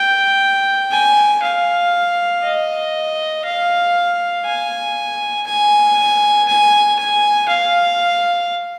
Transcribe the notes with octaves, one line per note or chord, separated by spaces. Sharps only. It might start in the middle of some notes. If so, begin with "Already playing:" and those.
Already playing: G5
G#5
F5
D#5
F5
G#5
G#5
G#5
G#5
F5